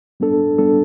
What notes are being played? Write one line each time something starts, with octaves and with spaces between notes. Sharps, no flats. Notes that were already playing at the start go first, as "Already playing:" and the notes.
G3 B3 D4 A4
G3 B3 D4 A4